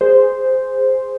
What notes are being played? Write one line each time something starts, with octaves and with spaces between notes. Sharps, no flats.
G#4 C5